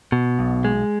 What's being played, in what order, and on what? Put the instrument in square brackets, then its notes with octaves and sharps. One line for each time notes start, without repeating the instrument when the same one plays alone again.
[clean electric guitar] B2
B1
G#3